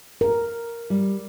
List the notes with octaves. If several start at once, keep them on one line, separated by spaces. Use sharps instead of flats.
A#4
G3